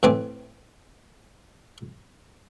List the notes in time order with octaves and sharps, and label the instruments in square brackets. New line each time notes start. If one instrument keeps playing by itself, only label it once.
[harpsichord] A2 E3 C4 G#5 D6